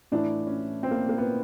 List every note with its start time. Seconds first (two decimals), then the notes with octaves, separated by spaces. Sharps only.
0.12 A2 E3 D4
0.47 C#4
0.83 C4
0.91 A#3
1.09 A#3
1.18 B3